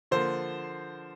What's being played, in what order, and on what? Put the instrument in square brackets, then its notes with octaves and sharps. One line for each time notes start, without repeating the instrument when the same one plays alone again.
[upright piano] D3 F3 A#3 C5